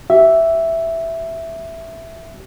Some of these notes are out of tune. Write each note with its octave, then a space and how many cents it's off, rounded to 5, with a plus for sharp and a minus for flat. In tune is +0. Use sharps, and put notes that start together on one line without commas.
G4 -40 E5 +0